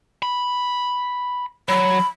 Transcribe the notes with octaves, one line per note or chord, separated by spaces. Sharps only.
B5
F#3 B5